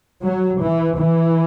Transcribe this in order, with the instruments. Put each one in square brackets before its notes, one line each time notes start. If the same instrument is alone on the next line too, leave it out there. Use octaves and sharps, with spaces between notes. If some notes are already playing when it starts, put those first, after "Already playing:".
[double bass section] F#3
E3
E3